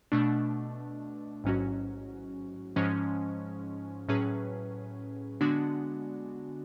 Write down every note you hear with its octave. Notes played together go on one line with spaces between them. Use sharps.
B2 A3 D4
A1 G#2 F#3 C#4 F#4
G#2 F3 G#3 C#4
A2 F#3 C#4 G#4 B4
D3 G#3 B3 D4 F#4